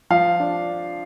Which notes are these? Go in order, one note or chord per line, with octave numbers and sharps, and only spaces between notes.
F3 F5
D4